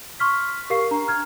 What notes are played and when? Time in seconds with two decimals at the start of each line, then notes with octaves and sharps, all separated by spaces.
0.20 C6 C#6 F6 B6
0.70 G4 A#4 F5 C#6 C7
0.91 D4 A#5
1.08 F6 G#6